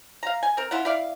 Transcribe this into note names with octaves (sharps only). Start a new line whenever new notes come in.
F5 A#5
G#5
C4 A#4
C#4 E4 F4 F#5
E4 D5 F5